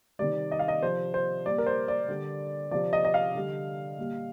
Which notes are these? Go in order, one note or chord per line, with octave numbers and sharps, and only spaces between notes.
C3 D#3 G3 D5
D#5
F5
D#5
C3 F3 C5
C5
A#2 G3 D5
A#4
C5
D5
D3 G3
C3 F3 D5
D#5
D#5
F5
D3 G3
A#2 G3